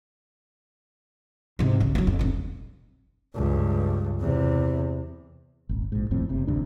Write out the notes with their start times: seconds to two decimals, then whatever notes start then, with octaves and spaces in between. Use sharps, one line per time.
1.59 G#2 C3
1.80 B1 C#3
1.95 F#3 B3
2.07 F2
2.19 F1 A#1
3.35 C#2 G2
4.20 E2 C3
5.69 D#1 G#1
5.92 A#1 G#2
6.11 D#1 F2 A2 C4
6.29 F#1 C3
6.47 A1 D2 C3 D4